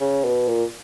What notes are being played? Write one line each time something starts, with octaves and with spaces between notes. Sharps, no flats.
C#3
B2
A#2